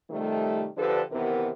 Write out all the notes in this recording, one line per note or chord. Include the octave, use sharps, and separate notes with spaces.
C3 D#3 F3 G3 A3
D3 F3 D4 G4 A4 B4
D#2 C3 E3 B3 A#4